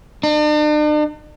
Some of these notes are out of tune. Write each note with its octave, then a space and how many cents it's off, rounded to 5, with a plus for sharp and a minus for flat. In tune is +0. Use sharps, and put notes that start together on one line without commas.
D4 +45